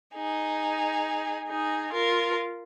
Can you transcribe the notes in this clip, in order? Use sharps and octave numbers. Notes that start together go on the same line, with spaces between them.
D#4 G#4
D#4 G#4
F4 A#4